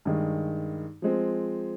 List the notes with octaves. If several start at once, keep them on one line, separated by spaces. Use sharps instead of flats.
G2 D#3 G#3
F3 G#3 C4